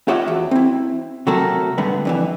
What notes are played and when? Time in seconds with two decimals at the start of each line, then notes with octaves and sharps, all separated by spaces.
0.08 F4 G4 C#5 D#5 E5 F#5
0.28 E2 F#4
0.51 C4 E4
1.27 C3 F#3 A3 F#4 A4 A#4
1.78 G2 D3 A3 B3
2.05 F2 D3 E3